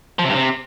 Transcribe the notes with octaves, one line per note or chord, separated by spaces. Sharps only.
F3
C3
G2
C3